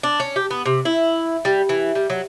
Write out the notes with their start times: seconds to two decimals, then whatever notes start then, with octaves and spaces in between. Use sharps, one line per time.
0.03 D4
0.20 C#4
0.36 G4
0.51 B3
0.66 C3
0.85 E4
1.45 G3
1.69 E3
1.95 G3
2.10 F#3